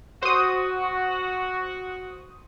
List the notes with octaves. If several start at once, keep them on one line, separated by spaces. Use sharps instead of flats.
F#4 C5 D#6